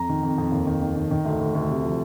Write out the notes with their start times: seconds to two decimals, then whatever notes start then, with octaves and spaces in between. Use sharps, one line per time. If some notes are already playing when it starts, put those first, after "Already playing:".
Already playing: F2 A#5
0.09 D#3
0.23 F2
0.38 F2
0.52 D#2
0.67 D#3
0.82 D#3
0.96 D#3
1.11 D#3
1.25 D2
1.40 D2
1.55 D2
1.69 C3
1.84 F3